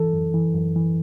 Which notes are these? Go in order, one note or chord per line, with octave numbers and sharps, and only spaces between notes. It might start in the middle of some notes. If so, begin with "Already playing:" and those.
Already playing: E3 A4
F#2
E3
F#2
E3